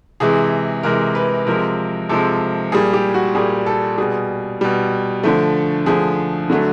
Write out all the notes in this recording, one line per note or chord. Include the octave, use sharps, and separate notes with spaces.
C3 E3 G#3 G#4
C3 E3 G#3 A#4
B4
C3 F3 G#3 A#4
C3 F3 G#3 A4
A#2 G3 G#4
G4
F#4
A#2 G3 G#4
A4
B2 G3 G#4
B2 G3
D3 F3 A3
D3 F3 A3 G#4
D3 F#3 A3